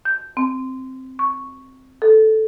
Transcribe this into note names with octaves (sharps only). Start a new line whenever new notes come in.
G6
C4
C#6
A4